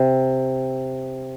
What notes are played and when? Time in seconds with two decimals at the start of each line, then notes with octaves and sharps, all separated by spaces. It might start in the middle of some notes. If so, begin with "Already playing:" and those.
Already playing: C3